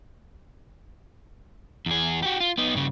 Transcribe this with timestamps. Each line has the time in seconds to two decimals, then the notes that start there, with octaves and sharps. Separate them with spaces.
1.86 E2 G#4
2.23 F#4 G4
2.40 F4
2.58 B3 D#4
2.74 G2 C#3